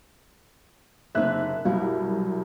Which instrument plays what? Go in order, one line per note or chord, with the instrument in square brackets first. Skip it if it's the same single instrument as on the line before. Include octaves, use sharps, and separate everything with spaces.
[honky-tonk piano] F#1 E5 F#6 [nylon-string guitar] C3 A#3 D#4
[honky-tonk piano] C2 F#2 [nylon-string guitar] B2 E4